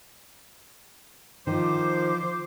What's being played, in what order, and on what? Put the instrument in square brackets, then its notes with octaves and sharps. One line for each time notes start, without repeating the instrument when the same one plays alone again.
[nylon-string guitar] D#3 [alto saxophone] F3 [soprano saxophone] C5 [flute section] D6